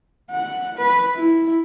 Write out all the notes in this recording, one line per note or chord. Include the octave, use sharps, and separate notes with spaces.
F#5
B4
E4